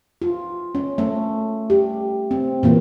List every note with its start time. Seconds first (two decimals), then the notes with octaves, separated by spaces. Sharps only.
0.22 F4
0.75 C#4
0.98 A3
1.70 G4
2.31 C4
2.63 A#2 E3 A#3